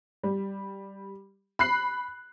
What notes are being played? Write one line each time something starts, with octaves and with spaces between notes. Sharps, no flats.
G3
B5 F#6 C7